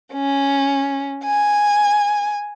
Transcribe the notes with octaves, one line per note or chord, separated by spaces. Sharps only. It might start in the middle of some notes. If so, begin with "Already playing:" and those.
C#4
G#5